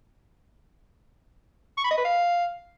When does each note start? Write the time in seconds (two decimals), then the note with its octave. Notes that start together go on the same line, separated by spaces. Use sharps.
1.77 C#6
1.84 B5
1.91 D#5
1.98 B4
2.04 F5